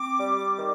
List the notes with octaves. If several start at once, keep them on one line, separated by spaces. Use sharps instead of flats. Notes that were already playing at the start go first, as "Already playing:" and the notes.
Already playing: C4 D6
G3
D#3